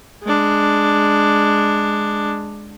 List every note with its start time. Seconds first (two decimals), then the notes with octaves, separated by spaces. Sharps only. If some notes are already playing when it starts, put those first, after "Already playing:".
0.23 G#3 D4